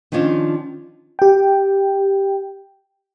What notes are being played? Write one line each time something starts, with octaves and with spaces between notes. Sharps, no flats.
D#3 F3 C#4 D4 F4
G4 G5